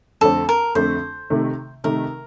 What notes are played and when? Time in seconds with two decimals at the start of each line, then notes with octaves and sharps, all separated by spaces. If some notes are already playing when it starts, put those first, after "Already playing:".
0.21 F2 D3 A3 C4 A4
0.49 A#4
0.75 F2 D3 A3 C4 C5
1.30 C3 D#3 A3
1.84 C3 D#3 A3 A#4